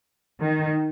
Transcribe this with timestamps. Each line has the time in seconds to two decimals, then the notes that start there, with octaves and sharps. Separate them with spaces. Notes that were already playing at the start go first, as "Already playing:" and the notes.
0.41 D#3